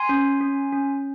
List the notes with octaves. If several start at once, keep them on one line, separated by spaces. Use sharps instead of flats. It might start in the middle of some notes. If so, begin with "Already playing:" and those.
Already playing: G#5 C6
C#4
C#4
C#4